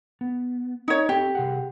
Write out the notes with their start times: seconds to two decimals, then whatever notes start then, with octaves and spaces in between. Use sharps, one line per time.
0.21 B3
0.88 D#4 C#5
1.09 C4 G4 A4
1.35 C3 G#4 F#5